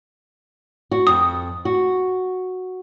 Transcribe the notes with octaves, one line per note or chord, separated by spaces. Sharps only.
F#4
F2 D#6
F#4